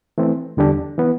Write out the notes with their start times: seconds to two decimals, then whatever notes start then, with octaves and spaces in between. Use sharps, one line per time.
0.18 E3 A3 C4
0.57 E2 D3 G3 D4 G4
0.98 E3 B3